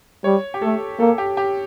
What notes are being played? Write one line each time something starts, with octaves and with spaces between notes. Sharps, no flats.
G3 C#5
G4
A3 A4
A#3 A4
G4
G4